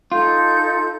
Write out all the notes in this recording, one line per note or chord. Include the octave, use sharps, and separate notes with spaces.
D#4 F4 A4 G6